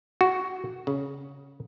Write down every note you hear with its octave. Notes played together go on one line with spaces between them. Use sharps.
F#4
C#3